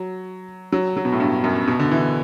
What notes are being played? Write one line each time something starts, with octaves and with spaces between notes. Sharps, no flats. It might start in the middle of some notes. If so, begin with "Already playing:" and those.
Already playing: F#3
F#3
F#3
B2
A2
G2
F#2
B2
D3
E3